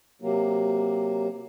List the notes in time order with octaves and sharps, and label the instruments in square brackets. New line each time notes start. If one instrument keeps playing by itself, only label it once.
[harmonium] C3 F#3 A#3